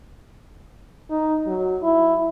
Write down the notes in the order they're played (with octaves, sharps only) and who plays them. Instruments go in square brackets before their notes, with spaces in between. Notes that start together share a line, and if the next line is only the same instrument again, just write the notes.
[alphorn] D#4
F#3
E4